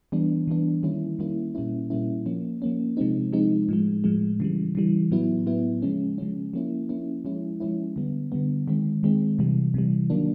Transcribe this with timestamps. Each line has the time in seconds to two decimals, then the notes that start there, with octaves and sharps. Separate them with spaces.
0.12 E3 G3 B3 D4
0.47 E3 G3 B3 D4
0.83 D#3 G3 A#3 C#4 E4
1.19 D#3 G3 A#3 C#4 E4
1.55 A#2 G3 A#3 C#4 E4
1.90 A#2 G3 A#3 C#4 E4
2.26 F3 A#3 C#4
2.62 F3 A#3 C#4
2.97 C3 F3 G#3 C4 D#4
3.33 C3 F3 G#3 C4 D#4
3.69 A2 F3 G#3
4.04 A2 F3 G#3
4.40 C#3 E3 G3
4.75 C#3 E3 G3
5.11 A2 F#3 B3 E4
5.46 A2 F#3 B3 E4
5.82 C#3 F3 G#3 C#4
6.18 C#3 F3 G#3 C#4
6.54 F3 A#3 C#4 E4
6.89 F3 A#3 C#4 E4
7.25 F3 G#3 C#4 E4
7.60 F3 G#3 C#4 E4
7.96 D3 G3 B3
8.32 D3 G3 B3
8.68 D#3 G#3 C4
9.03 D#3 G#3 C4
9.39 C3 E3 G3
9.74 C3 E3 G3
10.10 D#3 F#3 A#3 D4